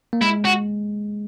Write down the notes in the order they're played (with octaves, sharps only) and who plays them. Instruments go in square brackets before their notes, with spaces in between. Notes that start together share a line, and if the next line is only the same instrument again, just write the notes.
[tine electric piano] A#3
[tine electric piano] G#3 [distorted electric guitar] E4
[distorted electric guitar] F#4